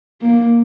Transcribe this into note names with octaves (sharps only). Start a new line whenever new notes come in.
A#3